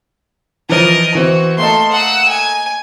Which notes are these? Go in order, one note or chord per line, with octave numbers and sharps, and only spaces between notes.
E3 F3 A#4 D#5
E3 C4 F#4
A3 A#3 A4 D#5 C6
F#5 E6
G#5